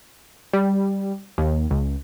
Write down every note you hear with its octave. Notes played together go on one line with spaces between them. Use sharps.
G3
D#2
C#2